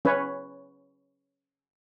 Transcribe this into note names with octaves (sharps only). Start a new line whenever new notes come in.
C#4 B4 C#5